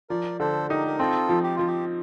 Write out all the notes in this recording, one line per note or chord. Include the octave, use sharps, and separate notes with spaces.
F3 A#4 D5
D3 A4 C5
D#4 G4 A#4
A#4
C4 F4 A4
F3
G4
F3 F4
G4